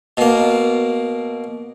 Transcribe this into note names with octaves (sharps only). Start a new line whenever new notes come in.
B2 A#3